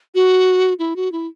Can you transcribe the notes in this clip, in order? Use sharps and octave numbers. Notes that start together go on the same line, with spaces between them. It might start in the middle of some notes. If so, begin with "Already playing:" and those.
F#4
E4
F#4
E4